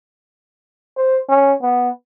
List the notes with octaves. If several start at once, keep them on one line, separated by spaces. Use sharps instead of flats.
C5
C#4
B3